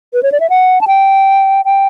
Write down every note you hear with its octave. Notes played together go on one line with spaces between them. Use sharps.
B4
C#5
D5
E5
F#5
A5
G5
G5